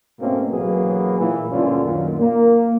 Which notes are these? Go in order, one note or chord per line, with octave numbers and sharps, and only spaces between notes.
G#2 B2 A3 A#3 C4 C#4
A1 B2 F#3 A#3 B3 G#4
A#2 E3
D2 G2 A#2 D3 C#4 F4
F#2 A#2 D#3
A#3